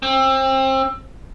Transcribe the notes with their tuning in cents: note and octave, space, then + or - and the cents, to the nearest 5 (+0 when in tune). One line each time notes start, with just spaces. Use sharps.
C4 +30